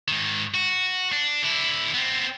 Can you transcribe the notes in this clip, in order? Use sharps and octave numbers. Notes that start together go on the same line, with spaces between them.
G#2 D#3
F#4
D4
D3 E4
B3 C4